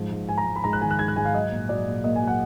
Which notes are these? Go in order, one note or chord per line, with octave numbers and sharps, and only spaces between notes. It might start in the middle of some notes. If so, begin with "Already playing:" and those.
Already playing: G#2 F3
G#2
G#2 G#5
A#5
G#2
B5
G#2 A#5
F#6
D#3 G#5
F#6
G#2 G#6
F#6
G#2 G#5
F5
F#3 D#5
A#2
F#3 D5
A#2
A#3 D#5
G#5
F#3
F#5